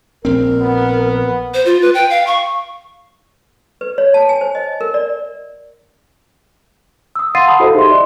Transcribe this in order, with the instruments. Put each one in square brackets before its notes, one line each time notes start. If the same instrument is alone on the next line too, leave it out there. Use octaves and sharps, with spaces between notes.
[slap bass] A#1 C4 [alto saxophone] A#4
[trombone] B3
[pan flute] C5
F4
B4
G5
F5
C#6
[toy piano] B4
C#5
A5
G#5
C5
D#5
A#4
D5
[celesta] D#6 E6
F5 F#5 C6 A6 C7 D#7
F#5 A5 B5 D#6
E4 F#4 A4 C5 D#5 F5
D#4 G4 G#4 D#5 E5 C6
D5